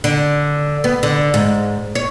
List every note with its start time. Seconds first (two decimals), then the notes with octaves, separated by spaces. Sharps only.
0.04 D3
0.84 B3
1.03 D3
1.34 G#2
1.95 C#5